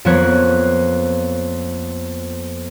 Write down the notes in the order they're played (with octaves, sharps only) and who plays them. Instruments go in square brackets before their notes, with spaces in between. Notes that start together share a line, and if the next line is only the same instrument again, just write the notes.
[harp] F2 F3 A#3 B3 C#5 F#6